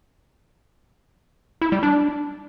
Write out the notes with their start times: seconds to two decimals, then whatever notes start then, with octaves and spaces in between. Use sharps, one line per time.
1.61 E4
1.72 G3
1.83 D4